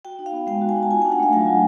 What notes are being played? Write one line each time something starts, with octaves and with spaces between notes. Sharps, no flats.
F#4 G5
D#4
F5
B3
G#3 G5
F#4
G#5
D#4
A5
F4 G#5
G5
D4
F#5
A3 F5
F#3 F#5
F4